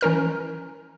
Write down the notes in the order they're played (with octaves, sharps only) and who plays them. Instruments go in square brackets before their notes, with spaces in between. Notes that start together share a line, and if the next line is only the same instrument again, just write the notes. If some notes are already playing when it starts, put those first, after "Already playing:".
[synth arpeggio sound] E3 C#4 A#4 F6